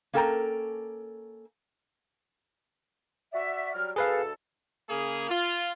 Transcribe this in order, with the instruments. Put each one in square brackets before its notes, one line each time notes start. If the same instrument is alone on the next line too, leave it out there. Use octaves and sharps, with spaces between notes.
[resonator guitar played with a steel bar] A#3 C#4 A4 A#4 G5
[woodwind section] F#4 D5 E5
F#3 G3 F6
[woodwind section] D2 A4 [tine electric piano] G#4 B4 F5
[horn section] C#3 A#3 G#4
F4